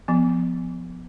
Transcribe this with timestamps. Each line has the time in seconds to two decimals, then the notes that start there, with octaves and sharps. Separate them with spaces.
0.08 F3 B3